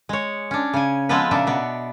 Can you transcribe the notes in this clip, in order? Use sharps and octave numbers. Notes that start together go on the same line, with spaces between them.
G#3 C#5
C#4 D4
C#3 G#5
F3 G#3 B3 C4 A4 B4
A#2 C#3 D4 E5
B2 B3